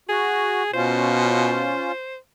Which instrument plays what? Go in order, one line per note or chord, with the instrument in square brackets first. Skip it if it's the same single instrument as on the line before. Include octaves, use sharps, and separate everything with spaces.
[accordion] F#4 [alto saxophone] G#4
[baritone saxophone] B2 [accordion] C#4 F4 [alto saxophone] C5